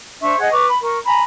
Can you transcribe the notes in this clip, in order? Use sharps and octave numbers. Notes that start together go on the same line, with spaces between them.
D4 C5 E5 C#6
G#4 D#5 F#5
B4 C#6 D6
B5
A#4 C#6
G#5 A#5 B5